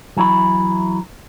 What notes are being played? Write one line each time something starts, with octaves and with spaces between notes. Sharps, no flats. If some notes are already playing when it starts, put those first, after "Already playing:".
E3 F#3 E4 F5 B5